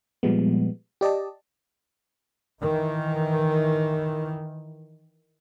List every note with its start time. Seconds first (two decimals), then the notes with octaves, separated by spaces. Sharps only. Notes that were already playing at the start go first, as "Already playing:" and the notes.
0.23 A#2 F3 G3 G#3 B3
1.01 G4 D5 D#5 A5
2.61 D#3 E3